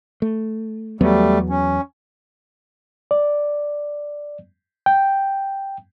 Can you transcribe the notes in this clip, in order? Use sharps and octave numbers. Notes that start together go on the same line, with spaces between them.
A3
E2 F#3 G3 A3 B3
C#4
D5
G5